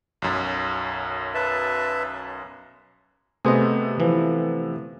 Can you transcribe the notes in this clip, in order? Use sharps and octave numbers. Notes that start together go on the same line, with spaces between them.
B1 F#2
B4 E5 A5
C3 A3 B3 G#4 C5 D#5
E3 F3